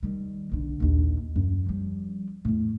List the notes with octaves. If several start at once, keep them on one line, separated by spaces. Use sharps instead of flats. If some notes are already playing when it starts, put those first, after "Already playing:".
D#3 G3
B1 D3
A#1 D#2
F#2
F3 G3
E2 A2